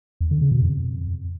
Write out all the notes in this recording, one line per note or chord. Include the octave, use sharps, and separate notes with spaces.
E2
D3
C#3
B2
F2